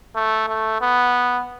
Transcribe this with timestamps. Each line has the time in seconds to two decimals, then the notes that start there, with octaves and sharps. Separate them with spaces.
0.15 A3
0.48 A3
0.81 B3